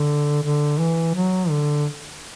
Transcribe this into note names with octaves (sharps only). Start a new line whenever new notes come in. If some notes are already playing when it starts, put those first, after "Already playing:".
Already playing: D3
D3
E3
F#3
D3